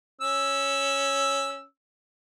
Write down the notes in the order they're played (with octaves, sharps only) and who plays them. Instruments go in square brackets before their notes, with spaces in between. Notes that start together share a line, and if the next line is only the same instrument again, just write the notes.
[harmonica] C#4 E6